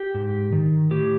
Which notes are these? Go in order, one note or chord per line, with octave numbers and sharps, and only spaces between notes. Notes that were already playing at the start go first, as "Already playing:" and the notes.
Already playing: G4
G#2
D#3
A2 G4